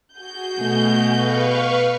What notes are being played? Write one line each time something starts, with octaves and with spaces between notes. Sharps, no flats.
F#4 G#4 G6
B2 A3
B4 F5 C#6